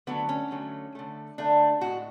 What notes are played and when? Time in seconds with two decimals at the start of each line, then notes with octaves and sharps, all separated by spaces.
0.07 D3 F#3 A3 B3
0.29 C#4
0.51 D3 F#3 A3
0.95 D3 A3
1.38 D3 A3 D4
1.81 A2 G#3 F#4